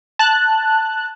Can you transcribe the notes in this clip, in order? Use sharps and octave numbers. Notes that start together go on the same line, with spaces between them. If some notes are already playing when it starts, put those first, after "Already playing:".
A5 F#6